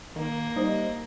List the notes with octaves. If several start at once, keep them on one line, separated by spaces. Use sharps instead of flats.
D#3 A#3
G3 D#4 C5 D#5